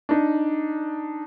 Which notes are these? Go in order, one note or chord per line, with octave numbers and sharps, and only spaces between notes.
D4 D#4